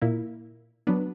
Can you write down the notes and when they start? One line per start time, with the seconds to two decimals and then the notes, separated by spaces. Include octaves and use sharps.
0.02 A#2 A#3 E4
0.87 F#3 B3 D4